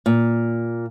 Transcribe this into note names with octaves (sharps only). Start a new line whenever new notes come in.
A#2